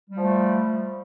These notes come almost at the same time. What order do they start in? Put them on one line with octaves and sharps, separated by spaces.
G3 F3 A3